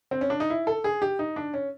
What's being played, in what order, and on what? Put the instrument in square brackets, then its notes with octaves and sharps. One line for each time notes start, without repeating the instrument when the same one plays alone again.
[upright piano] C4
C#4
D4
D#4
E4
A4
G#4
G4
D#4
D4
C#4